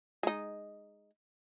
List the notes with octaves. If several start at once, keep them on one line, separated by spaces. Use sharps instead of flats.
G#3 D#4